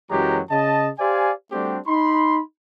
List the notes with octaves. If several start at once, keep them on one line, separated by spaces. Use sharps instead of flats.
F#2 E3 F#3 G#3 G4 A#5
C#3 D#5 A5
G4 C5 D5 F5 G#5
G3 A3 C4 D4 F#4 G4
D#4 B5 C6